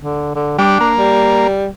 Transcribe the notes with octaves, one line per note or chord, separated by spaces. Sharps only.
D3
D3
G3 D4
A#3
G3